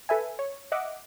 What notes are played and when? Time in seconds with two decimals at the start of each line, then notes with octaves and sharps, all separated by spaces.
0.09 A4 B4 E5 G#5
0.39 C#5
0.72 D#5 E5 F#5 D6